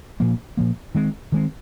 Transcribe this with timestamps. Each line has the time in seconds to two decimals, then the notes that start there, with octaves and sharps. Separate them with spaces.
0.20 A#2 F3 A#3
0.57 A#2 F3 A#3
0.95 D#3 G#3 C4
1.32 D#3 G#3 C4